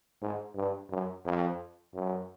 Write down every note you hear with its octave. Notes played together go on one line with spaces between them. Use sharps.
G#2
G2
F#2
F2
F#2